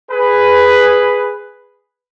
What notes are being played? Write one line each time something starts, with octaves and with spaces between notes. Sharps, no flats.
G#4 B4